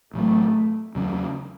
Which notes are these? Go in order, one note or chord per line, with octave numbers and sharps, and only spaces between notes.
A1 A2 F#3 A3
E2 C#3 F#3 C#4